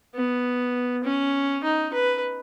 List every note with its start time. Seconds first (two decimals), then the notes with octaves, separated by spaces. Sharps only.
0.15 B3
1.04 C#4
1.64 D#4
1.93 B4